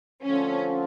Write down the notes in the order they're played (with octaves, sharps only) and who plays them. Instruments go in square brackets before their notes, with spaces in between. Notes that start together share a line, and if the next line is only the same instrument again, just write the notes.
[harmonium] D3 F3 A3 C4 F4 [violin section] C#4